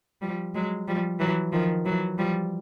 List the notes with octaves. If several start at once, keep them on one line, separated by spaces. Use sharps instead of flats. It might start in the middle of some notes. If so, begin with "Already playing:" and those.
F3 G3
F#3 G#3
F3 G3
E3 F#3
D#3 F3
E3 F#3
F3 G3